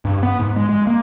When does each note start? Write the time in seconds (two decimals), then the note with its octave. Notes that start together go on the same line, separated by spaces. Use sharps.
0.05 G2
0.23 B3
0.39 G#2
0.56 G#3
0.69 G#3
0.87 A#3